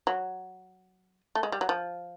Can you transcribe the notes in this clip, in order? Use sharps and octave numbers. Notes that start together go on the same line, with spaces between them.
F#3
A3
G#3
G3
F#3
F3